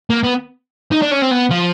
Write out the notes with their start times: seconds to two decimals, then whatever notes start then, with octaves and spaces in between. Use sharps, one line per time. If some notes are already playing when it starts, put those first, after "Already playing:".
0.10 A#3
0.24 B3
0.92 D#4
1.02 D4
1.12 C#4
1.22 C4
1.32 B3
1.51 F3